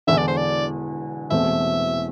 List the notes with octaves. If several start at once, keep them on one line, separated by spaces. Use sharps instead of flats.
E1 E2 D3 E5
D5
C5
D5
E1 E2 B2 A3 C4 E5